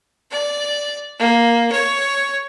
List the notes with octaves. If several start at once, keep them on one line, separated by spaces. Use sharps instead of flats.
D5
A#3
C#5